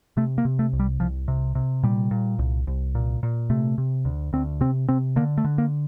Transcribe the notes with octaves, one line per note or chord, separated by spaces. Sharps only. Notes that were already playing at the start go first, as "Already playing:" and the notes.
C3 A3
A#3
C3
A3
C2
G3
C2 F3
C3
C3
A#2 G3
A#2
C2
C2
A#2
A#2
C3 A3
C3
D2
D2 C4
C3 C4
C3 C4
D3 A#3
A3
D3
A#3